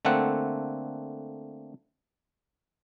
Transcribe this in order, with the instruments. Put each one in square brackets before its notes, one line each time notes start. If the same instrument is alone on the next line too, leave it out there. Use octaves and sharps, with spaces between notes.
[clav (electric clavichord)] D3 A3 A#3 C4 F#5